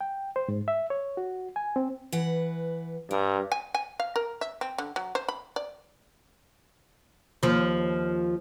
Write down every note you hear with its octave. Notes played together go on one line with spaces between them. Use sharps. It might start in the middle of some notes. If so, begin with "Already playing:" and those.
G5
C5
G#2
E5
C#5
F#4
G#5
C4
E3 B4 F#5
G2 A#4
G#5
G#5
F5
A#4
E5
C4
D3
F#3
C5
B5
D5
D#2 F3